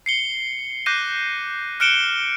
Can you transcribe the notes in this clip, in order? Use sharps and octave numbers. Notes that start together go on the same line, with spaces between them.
C7 C#7 G7
D6 F#6 G6 A#6 C7 D#7
F6 F#6 C#7 D7 E7 G7